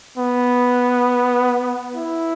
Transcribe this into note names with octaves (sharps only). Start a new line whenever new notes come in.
B3
E4